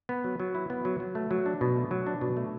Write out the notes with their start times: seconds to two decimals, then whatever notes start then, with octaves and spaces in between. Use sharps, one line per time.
0.09 B3
0.24 F#3
0.40 F#3
0.55 E4
0.70 B3
0.85 F#3
1.00 F#3
1.15 A3
1.31 F#3
1.46 D4
1.61 B2
1.76 A3
1.91 F#3
2.07 D4
2.21 B2
2.37 A3